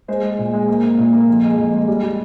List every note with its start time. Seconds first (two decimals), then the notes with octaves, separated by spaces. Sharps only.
0.08 G#3 C5
0.23 G#3
0.38 A#2
0.53 G#3
0.68 A#3
0.84 A#3
0.98 A#2
1.13 A#3
1.28 F2
1.43 G#3
1.58 F2
1.73 G#3
1.88 G3
2.03 G3